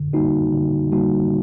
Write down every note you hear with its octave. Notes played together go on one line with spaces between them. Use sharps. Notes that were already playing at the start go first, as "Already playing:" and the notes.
Already playing: D3
G3 A#3 D#4 F#4
D3
G3 A#3 D#4 F#4